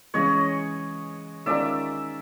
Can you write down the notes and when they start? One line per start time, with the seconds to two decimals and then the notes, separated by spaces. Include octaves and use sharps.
0.14 C#3 E3 G#3 C#4 C#5 D#5
1.46 D#3 G#3 C#4 F4 A#4 D5 E5